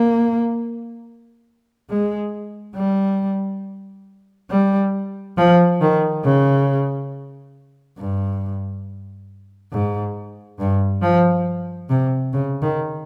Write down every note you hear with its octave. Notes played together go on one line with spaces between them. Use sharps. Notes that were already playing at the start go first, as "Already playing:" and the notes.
Already playing: A#3
G#3
G3
G3
F3
D#3
C#3
G2
G#2
G2
F3
C3
C#3
D#3